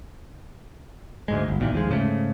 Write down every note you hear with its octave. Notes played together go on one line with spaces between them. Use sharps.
D2 G#2 G#3
G1
B1 A#2 D#3 E3
D#2 F3 G#3
G#2 C#3 A3